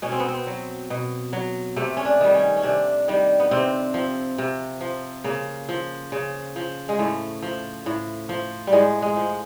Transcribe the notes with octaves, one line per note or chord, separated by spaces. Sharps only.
B2 C#4
C4
B3
C4
F#3
B2
F#3
C3 A3
C#4
D4
D#3 G3
C#4
C#4
C3 D4
D#3 G3
B3
C3 C4
F3
C3
F3
C#3 A#3
F3
C#3
F3
G#3
A2 A3
F3
A2
F3
G3
A2 G#3
G#3
F3